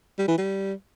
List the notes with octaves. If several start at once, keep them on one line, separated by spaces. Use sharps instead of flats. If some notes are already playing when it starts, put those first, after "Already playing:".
G3
E3
G3